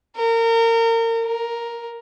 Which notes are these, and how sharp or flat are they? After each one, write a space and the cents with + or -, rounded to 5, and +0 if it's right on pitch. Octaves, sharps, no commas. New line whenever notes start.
A#4 -30
A#4 +5